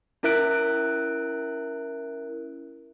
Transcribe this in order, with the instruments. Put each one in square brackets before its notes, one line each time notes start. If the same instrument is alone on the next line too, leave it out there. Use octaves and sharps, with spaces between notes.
[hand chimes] C#4 E4 A#4 E5 F#6 D7